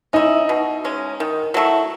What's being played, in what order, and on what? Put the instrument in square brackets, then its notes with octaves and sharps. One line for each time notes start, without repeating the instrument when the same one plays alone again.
[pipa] C#4 E4 [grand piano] D#4
[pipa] B2
G#3 C#4
D#3
F#3 A3 E4